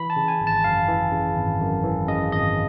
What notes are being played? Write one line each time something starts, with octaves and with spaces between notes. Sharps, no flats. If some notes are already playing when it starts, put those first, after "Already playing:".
Already playing: E3 B5
A5
C#3
G#5
G#1
A5
F#2 F5
E3
C#3
G#1
F#2
E3
C#3 D#5
G#1 D#5